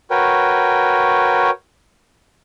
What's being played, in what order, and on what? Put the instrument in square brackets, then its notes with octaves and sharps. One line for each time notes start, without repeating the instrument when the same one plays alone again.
[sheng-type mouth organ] F#4 A#4 B4 C#5 G5